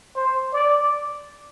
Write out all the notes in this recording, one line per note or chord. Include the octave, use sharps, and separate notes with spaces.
C5
D5